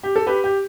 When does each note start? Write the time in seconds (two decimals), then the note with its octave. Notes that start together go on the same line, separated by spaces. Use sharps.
0.03 G4
0.16 A4
0.27 G4 B4
0.44 G4